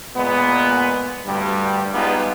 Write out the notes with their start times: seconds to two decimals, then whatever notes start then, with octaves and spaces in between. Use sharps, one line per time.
0.15 A#2 G#3 B3
1.26 D2 G2 G3
1.93 G3 G#3 B3 D#4 F4